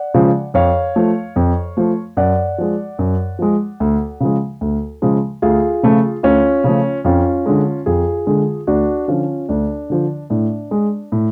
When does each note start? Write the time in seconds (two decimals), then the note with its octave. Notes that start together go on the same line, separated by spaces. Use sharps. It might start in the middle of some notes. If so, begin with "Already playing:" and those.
Already playing: D5 F#5
0.14 C#3 F3 G#3
0.54 F2 C#5 F5
0.96 F3 A3
1.36 F2
1.77 F3 A3
2.17 F#2 D5 F#5
2.58 F3 G#3
2.99 F#2
3.39 F3 G#3
3.80 D2
4.20 C#3 F3 G#3
4.61 D2
5.02 C#3 F3 G#3
5.42 D2 F4 G#4
5.83 C#3 F3 A3
6.23 D2 C#4 F4
6.64 C#3 F3 A3
7.05 F2 C#4 F4
7.46 D3 G#3
7.86 F2 F4 G#4
8.27 D3 G#3
8.67 D2 D4 F#4
9.08 D3 F3 C#4 F4
9.49 D2 D4
9.90 D3 F3
10.30 A2 D4
10.71 G#3
11.12 A2